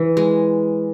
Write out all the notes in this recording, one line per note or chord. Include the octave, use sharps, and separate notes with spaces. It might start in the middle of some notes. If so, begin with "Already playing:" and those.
Already playing: E3
G#3